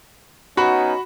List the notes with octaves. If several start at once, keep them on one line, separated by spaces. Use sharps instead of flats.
B3 C#4 D#4 F#4 B5